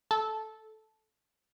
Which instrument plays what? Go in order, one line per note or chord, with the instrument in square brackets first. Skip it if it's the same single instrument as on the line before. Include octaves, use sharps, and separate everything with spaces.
[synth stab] A4